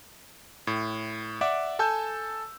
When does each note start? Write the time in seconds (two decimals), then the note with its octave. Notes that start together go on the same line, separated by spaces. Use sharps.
0.67 A2
1.41 D5 E5 F#5 D6
1.79 A4 G#5 A5 E6 G6